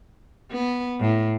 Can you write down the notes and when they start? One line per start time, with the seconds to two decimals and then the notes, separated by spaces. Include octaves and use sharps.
0.50 B3
1.00 A2